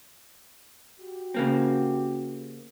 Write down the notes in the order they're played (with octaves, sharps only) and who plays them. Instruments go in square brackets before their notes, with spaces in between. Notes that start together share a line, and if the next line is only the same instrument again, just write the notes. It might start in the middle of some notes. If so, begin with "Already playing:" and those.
[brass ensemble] F#4 G4
[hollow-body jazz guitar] C#3 A#3 C4